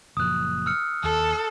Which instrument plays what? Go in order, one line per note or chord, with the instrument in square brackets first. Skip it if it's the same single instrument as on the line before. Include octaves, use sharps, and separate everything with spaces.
[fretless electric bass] F#1 A#2 F3 [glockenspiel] D#6 F#6
[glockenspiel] E6 F6 C#7
[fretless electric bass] D#2 [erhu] A4